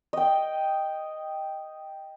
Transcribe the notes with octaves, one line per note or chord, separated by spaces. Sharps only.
D#5 G5